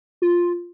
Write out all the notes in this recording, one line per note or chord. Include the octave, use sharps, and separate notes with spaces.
F4